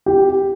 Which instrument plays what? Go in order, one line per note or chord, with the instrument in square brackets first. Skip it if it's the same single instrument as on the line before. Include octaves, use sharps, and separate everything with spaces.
[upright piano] G4